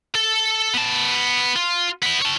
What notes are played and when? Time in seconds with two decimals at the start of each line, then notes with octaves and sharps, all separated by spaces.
0.15 A4
0.73 B3 A5
1.56 F4
2.03 B3 E4
2.21 C#5 A5